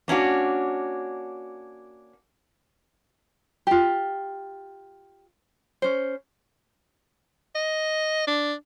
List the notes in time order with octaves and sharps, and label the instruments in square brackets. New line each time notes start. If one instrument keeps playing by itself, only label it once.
[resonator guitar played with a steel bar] A#3 C#4 D4 F#4
[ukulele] F4 G4
C#4 C5
[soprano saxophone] D#5
D4